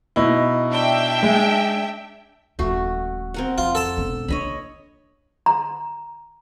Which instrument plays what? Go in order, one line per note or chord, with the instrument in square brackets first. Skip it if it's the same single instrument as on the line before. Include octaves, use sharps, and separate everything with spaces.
[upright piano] B2 D#4 E4
[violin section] D4 E5 G5
[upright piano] G#3
[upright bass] D#1 F3 [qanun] A3 F#4
[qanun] C4 A#4 F#5
[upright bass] F2 [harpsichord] F4
[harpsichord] A4 A5
[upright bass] E1 B3
[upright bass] A#3 D4 [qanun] C#5 D#5 B5
[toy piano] A#5